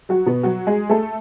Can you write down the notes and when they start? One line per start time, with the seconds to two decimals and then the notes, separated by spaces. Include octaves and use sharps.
0.09 F#3 F#4
0.26 B2 B3
0.43 F#3 F#4
0.67 G#3 G#4
0.89 A3 A4